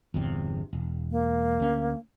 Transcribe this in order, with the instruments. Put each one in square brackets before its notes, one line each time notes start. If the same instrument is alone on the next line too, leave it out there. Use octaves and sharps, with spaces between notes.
[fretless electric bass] G1 E2 C3
E1
[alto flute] A#3
[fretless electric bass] D2 C#4